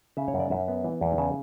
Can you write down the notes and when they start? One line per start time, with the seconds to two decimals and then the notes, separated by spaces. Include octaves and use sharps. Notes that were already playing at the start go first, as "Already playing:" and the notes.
0.17 C#3 E5
0.28 C#5
0.34 F#2
0.40 D5
0.51 F#2 E5
0.68 B3
0.84 E3
1.01 E2
1.18 C#3 A5